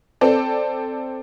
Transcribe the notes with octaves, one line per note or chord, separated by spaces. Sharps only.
C4 A4 D5